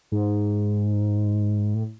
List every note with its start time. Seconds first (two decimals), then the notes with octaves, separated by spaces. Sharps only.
0.12 G#2
1.74 A2